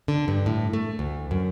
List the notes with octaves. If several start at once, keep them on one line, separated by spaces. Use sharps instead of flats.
D3
G2
A2
A3
D2
F#2